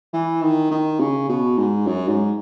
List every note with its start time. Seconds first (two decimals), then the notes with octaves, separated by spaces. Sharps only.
0.14 E3
0.42 D#3
0.71 D#3
1.00 C#3
1.29 B2
1.58 G#2
1.87 F#2
2.08 G#2